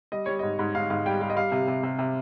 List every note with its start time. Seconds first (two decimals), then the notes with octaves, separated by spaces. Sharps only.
0.12 G3 D#5
0.26 G3 C#5
0.39 G#2 D#5
0.59 G#2
0.75 G#2 F5
0.90 G#2 F5
1.06 G3 G5
1.21 G3 F5
1.30 D#5
1.36 G3 F5
1.52 C3
1.68 C3
1.83 C3
1.99 C3